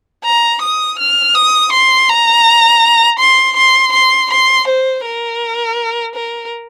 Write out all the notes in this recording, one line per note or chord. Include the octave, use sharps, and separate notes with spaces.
A#5
D#6
F6
D#6
C6
A#5
C6
C6
C6
C6
C5
A#4
A#4